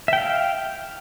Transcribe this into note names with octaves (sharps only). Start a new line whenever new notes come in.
E5 F5 G5